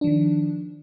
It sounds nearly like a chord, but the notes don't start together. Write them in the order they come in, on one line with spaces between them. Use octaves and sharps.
D4 F3 D#3